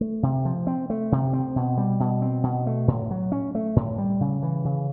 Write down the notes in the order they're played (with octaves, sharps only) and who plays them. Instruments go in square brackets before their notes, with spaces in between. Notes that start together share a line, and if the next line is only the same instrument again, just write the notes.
[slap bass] A3
C3
F3
C4
A3
C3
C4
B2
G3
B2
C4
B2
A3
A2
F#3
C#4
A3
A2
G3
C#3
E3
C#3